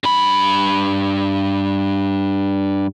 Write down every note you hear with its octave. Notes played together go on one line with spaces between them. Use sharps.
G2 B5